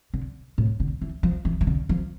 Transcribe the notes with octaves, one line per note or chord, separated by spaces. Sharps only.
D3
A2
D3
E3
F3
E3
E3
D3
F3